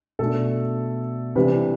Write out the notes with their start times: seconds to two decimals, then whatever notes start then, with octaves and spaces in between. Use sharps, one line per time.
0.19 B2 A3 D4 A4
1.36 C3 E3 G3 D4 B4